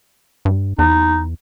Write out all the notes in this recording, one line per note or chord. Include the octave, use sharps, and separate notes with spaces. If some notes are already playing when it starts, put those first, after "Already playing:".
G2
E2 D#4